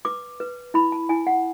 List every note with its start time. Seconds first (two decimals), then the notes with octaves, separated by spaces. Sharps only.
0.05 B4 D6
0.40 B4
0.74 E4 B5
0.92 A5
1.09 E4 G#5
1.27 F#5